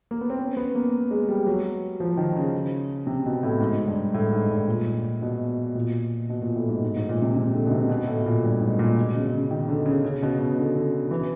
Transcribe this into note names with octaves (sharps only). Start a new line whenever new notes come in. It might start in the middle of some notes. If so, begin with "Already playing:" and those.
A#3
B3
C4
C#4
B3
A#3
G#3
G3
F#3
F3
D#3
C#3
C3
B2
A2
G#2
G2
A2
G#2
G2
A#2
B2
A#2
B2
A#2
A2
G#2
G#2
G#2
A#2
C3
C3
D3
B2
C3
B2
A2
A#2
G2
G#2
A#2
B2
C#3
C#3
D#3
D3
C#3
C#3
B2
B2
D3
D3
E3